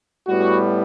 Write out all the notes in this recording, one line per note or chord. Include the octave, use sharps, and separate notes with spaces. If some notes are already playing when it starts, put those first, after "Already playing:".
A2 G3 B3 F#4